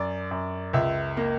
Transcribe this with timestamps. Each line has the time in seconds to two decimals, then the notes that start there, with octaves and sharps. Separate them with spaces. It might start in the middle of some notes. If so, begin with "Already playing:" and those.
Already playing: F#2 D5
0.31 F#2
0.73 C#2 E5
1.17 A#3